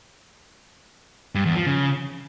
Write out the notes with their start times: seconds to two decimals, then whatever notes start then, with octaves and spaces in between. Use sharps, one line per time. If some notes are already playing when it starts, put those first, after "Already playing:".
1.35 G2
1.45 E2
1.56 F3
1.66 C#3